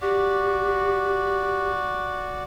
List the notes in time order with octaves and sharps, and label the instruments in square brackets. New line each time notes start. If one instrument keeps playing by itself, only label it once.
[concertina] F#4 D5 [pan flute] G4